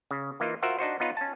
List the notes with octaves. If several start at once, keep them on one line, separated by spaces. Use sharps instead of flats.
C#3
E3 A#3 D#4 F4
F4 F#4 A#4 C5 E5 F#5
D4 D#4 F#4 C5
B3 D#4 F4 B4 C#5
C#4 A5